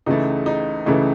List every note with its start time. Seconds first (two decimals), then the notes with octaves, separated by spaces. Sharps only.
0.06 C#2 C#3 E3 A3 D#4
0.46 D#4
0.86 C#2 C#3 E3 A3 D#4